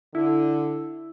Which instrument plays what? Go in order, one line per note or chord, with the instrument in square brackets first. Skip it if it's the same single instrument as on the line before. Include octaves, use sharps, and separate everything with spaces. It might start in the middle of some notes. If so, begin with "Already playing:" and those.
[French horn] D3 [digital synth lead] E4